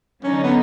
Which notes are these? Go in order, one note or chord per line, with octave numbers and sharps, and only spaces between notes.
D3 F#3 A#3 C#4 D#4
B3